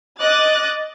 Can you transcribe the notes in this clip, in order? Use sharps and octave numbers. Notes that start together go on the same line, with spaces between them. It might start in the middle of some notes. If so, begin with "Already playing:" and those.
D#5 D6 F#6 A6